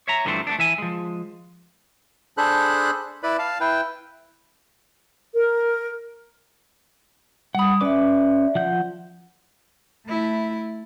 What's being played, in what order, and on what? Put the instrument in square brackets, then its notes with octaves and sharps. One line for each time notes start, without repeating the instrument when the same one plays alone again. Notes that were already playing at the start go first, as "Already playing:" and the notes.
[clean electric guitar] C#5 E5 A#5
G2 D3 E3 F3 A3 C4
A3 B3 D4
E3 E5 G#5
F3 G#3
[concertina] D4 G#4 A4 C5 B5 F#6
E4 B4 D5 B5
F5 A5
E4 B4 G5
[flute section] A#4
[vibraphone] G3 D#6 [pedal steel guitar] F#5 B5
[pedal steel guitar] C#4 B4 D6 [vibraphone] D5 E5
[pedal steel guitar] F3 F#5 G6
[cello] A3 E4